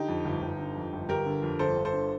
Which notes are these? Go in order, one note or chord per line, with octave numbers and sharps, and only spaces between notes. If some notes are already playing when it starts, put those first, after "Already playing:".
Already playing: D3 D#4 G4
F2
G1
G1
D3
F2
G1
G1 G4 A#4
D3
F2
G1 A4 C5
G1
A4 C5
D3